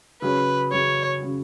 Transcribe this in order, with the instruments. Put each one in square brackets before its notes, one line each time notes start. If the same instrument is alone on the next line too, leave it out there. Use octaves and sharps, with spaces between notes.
[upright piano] C#3 F#3 C#4 [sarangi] B4
[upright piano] C#3 F#3 C#4 [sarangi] C#5
[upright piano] C#3 F#3 C#4